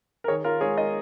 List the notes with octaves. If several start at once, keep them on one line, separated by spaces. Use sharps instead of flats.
A#4
D#3 G#4 C#5
F4 A#4
G#3 G#4 C#5
A#4 D#5